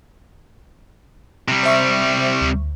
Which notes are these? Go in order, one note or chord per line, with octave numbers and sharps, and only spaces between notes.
C3 G3
C5 E5 C#6
D2